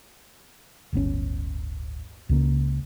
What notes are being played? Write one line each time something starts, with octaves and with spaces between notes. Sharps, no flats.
D1 G1 B3 C#4
C#2 C#3 A#3